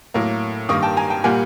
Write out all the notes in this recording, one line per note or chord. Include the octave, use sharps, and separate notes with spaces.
A2 F#3 A#3
G2 D#3 G3 A#3 C#6 D#6
G5 A5
G#5 A#5
G5 A5
A#2 G3 A#3 F#5 G#5